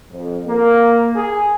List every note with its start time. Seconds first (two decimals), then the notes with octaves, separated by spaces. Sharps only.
0.12 F2
0.47 A#3
1.15 G#4